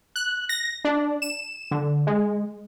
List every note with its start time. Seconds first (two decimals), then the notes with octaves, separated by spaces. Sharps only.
0.16 F#6
0.49 A#6
0.85 D4
1.22 E7
1.71 D3
2.07 G#3